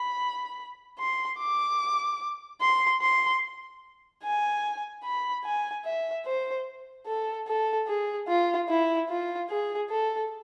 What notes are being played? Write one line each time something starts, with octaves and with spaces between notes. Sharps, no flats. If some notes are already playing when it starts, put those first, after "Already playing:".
Already playing: B5
C6
D6
C6
C6
G#5
B5
G#5
E5
C5
A4
A4
G#4
F4
E4
F4
G#4
A4